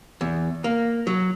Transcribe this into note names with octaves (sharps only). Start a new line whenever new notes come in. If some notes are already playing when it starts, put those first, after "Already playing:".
E2
A#3
F#3